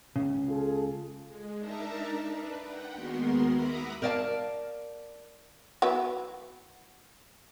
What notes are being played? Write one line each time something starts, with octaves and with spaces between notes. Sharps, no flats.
C#2 C#3
F4 G#4 A4
G#3
D4 D#4 A#4 E5 A5 A#5
D4 B4
F#5 G5
D#2 G#3 B3 F#4 A#4 C6
E5 F#5 A#5 B5 D6 D#6
A#4 C5 D5 D#5 F5 A5
F#3 B3 E4